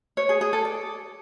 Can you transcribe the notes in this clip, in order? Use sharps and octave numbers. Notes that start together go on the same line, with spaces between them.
C#5
G#4
G#4
A4
D5